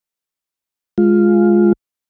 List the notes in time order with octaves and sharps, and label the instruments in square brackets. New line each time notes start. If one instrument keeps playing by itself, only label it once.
[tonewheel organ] G#3 F4